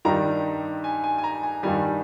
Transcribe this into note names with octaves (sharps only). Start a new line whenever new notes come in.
G2 D#3 G3 A#5
G#5
G#5
G#5
A#5
G#5
G2 D#3 G3 G#5